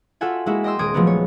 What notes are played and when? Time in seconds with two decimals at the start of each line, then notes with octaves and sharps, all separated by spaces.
0.21 F4 F#4 A4 E5 F#5 G#5
0.46 G#3 A#3 E4 F#4 E5
0.64 D#5 G5 C6 E6
0.79 D#1 G#3 D#6 G#6 D7
0.94 F3 F#3 G#3 A3 B3
1.07 C#5